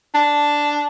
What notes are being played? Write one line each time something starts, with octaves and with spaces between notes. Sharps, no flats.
D4